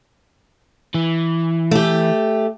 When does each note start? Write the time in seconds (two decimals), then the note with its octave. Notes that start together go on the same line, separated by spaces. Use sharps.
0.94 E3
1.71 A3 G4